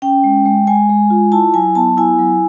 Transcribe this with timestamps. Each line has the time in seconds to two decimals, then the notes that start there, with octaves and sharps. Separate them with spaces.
0.02 C#4 G5
0.24 G#3
0.45 G#3
0.67 G#3 G#5
0.89 G#3
1.10 F4
1.32 E4 A5
1.54 F#3 G#5
1.75 B3 A5
1.97 E4 G#5
2.19 F#3